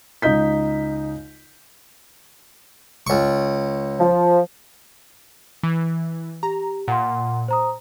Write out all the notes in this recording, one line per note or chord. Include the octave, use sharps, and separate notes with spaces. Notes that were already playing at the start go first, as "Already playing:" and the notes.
C#2 D#4 D#5 G6 B6
C#2 C#6
F3
E3
G4 A#5
A#2 F#5 C6
C5 A#5 D#6